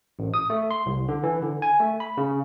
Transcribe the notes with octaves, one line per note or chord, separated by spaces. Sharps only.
A1
D#6
A3
C6
C2
D3
E3
D3
G#5
A3
B5
C#3